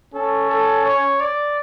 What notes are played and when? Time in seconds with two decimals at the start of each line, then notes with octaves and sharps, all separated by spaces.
0.14 C#4 A4
0.50 A4
0.85 C#5
1.20 D5